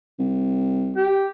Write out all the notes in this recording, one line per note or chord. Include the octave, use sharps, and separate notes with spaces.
C2
G4